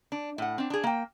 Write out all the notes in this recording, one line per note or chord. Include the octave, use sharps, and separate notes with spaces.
D4
A2 F#5
C4 D4
D4 G#4
A#3 G5